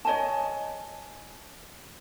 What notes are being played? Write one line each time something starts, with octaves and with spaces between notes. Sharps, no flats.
C#5 D#5 G#5 A5